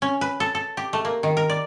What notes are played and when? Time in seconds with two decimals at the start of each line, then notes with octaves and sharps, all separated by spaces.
0.02 C#4
0.21 B4
0.40 A4
0.55 A4
0.77 G4
0.93 A3
1.05 A#3
1.23 D#3
1.37 A#4
1.50 D5